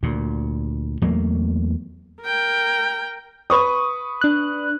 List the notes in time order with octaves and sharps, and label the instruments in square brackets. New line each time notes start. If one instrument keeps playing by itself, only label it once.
[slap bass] D2 A#2
E2 F#3 A3 A#3
[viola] A#4 G5
[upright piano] B4 C#6 D#6
[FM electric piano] D4 F#6